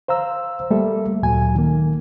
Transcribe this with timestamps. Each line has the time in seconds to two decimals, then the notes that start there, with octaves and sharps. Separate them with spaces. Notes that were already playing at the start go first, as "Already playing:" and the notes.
0.08 C5 F5 A#5 E6
0.71 G3 A3 A#3 A4 E5
1.23 D2 A#2 F#3 G#5
1.55 D#3 A#3